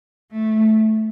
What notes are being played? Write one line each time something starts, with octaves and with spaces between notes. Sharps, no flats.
A3